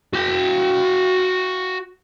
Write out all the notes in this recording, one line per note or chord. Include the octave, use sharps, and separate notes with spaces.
F#4 G5